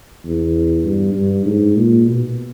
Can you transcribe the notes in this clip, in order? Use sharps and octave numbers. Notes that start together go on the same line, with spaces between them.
E2
G2
G2
G#2
A#2
B2